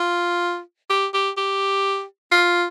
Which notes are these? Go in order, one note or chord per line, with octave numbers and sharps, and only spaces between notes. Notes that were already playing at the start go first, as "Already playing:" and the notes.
Already playing: F4
G4
G4
G4
F4